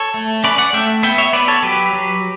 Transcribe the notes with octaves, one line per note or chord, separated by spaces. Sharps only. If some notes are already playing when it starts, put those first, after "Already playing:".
Already playing: A4 C#5
A3
C#4 B4 D5
D5 F#5
A3 E5 G5
B3 E5 G5
C#5 E5
B3 B4 D5
A4 C#5
F#3 G4 B4
F#3